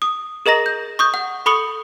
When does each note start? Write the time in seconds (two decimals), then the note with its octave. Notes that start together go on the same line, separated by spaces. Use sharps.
0.02 D#6
0.46 G#4 A#4 D#5 A#5 A#6
0.66 G6
0.99 C#6 D#6 G6
1.14 F#5
1.46 A4 B5 C#6 D#6 C#7 F#7